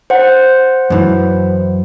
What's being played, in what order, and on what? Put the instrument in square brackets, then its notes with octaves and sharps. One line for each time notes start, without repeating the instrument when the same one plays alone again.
[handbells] C5 F#5
[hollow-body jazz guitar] F#2 E3